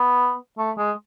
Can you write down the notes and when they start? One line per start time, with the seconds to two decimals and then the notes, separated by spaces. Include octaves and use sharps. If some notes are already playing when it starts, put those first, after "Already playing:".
Already playing: B3
0.58 A3
0.78 G#3